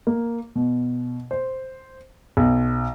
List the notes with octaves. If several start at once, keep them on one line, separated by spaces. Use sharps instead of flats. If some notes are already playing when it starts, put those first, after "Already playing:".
A#3
B2
C5
B1